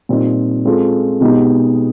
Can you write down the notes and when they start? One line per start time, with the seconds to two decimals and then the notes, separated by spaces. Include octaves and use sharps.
0.09 A#2 G3 C4 D#4
0.65 G#3 C4 F4 A4
1.21 B2 G#3 B3 D#4 G4